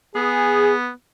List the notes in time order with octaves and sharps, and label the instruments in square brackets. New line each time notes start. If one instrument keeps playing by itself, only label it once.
[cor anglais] B3 [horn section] G#4